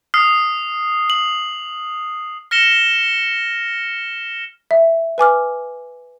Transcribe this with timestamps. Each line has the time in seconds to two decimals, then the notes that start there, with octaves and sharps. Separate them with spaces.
0.14 D#6 F6 C7
1.10 F#7
2.51 F6 A#6 C#7 E7 G7
4.71 E5
5.18 B4 G#5 D6 F6